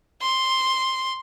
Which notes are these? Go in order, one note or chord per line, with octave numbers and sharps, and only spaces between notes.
C6